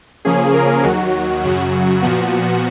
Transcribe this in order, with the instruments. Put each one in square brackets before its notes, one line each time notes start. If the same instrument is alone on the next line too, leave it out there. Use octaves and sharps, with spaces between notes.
[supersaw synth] C#3 F3 A#3 C#4 G#4
A#4
D#2 D#3 F#3 F#4
F#2 C#3 F#3 F#4
A#2 F3 B3 F#4